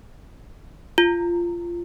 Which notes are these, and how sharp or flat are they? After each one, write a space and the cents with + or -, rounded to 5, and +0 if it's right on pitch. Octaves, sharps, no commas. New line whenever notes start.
F4 -15